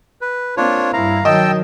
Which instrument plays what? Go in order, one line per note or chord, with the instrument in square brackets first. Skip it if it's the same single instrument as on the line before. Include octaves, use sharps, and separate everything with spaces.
[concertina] B4
[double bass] A#3 C4 [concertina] D4 F4 C#5
[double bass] G2 E4 [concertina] F5 A#5
[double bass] D#3 F#3 [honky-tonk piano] D#5 [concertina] G5 A5 E6